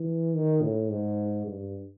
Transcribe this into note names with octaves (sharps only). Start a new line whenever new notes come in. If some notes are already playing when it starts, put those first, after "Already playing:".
Already playing: E3
D#3
A2
G#2
G2